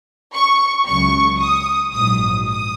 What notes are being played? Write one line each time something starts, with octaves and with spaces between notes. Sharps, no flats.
C#6
C#2 C#3 F#3 C#6
D#6
A#1 G#2 F#3 D#6
D#6